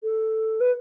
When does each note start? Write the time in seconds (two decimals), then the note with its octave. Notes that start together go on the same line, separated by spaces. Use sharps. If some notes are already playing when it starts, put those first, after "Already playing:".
0.03 A4
0.60 B4